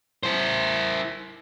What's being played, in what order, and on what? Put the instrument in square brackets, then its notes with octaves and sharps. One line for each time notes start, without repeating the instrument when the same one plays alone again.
[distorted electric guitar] E4 C5